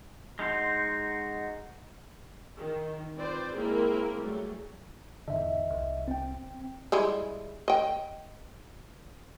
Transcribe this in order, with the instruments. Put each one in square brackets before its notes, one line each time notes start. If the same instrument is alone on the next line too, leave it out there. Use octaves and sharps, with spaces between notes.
[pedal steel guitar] G#3 D#4 F#4 C6 G6
[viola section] D#3
C4 F4 B4 C5 D5
G#3 A#3 C4 E4 G#4 A#4
F#3 G3 A3 G#4
[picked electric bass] E2 G#2 D3 [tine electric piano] D#5 E5
[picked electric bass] C2
[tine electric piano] C4 G5
[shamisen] G3 G#3 E4
D#5 G5